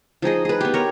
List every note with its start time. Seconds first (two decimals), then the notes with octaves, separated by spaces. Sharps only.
0.22 F3 D#4 G#4 D#5
0.45 G#4 B4
0.61 B3 G4
0.74 A#4 C#5